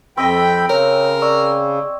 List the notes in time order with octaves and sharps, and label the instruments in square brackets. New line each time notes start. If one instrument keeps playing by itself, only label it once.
[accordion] F2 G5 B5 [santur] C4 D#5
[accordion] C#3 [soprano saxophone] A#4 [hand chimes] C#5
[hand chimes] D5 C#6 E6